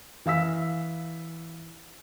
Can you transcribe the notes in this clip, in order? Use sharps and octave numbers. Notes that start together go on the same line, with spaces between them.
E3 F5 E6 B6